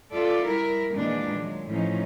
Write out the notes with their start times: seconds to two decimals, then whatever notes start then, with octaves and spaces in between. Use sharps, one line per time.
0.13 F4 A4 D5 E5
0.47 G3 E4 A#4
0.94 A#2 D#3 E3 G#3 A#3 D4
1.39 F#3 G#3
1.69 A2 E3 F3 C#4 D#4